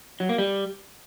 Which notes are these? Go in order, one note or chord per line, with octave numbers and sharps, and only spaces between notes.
F#3
A#3
G3